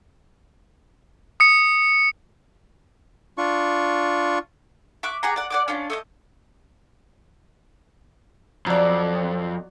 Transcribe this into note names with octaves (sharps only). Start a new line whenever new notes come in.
D#6 C#7
D4 F4 C#6
E5 C#6 D6 F#6
G4 G#4 F#5 A#5
D5 F#5
D5 F#5 D6
C#4 D4 F4
A3 D#5 G6
F2 F#3 D5